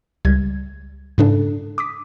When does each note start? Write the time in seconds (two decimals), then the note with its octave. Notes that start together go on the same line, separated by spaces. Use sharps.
0.25 C#2 G3 G#6
1.18 G#2 C#3 D4 A4
1.78 D6 D#6 B6